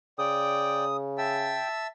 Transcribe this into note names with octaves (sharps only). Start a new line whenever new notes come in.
C#3 D5 G5 D#6
E5 G5 A5 E6